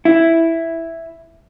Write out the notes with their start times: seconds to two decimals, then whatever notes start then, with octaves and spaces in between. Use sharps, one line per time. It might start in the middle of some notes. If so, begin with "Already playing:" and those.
0.05 E4